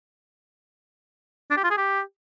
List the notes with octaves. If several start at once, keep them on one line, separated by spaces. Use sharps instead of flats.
D4
G4
F4
G#4
G4